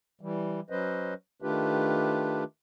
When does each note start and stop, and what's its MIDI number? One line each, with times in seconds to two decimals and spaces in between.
0.21 0.60 52
0.21 0.60 55
0.70 1.14 54
0.70 1.14 61
0.70 1.14 71
0.70 1.14 72
0.70 1.14 75
1.42 2.44 51
1.42 2.44 57
1.42 2.44 62
1.42 2.44 65
1.42 2.44 67
1.42 2.44 71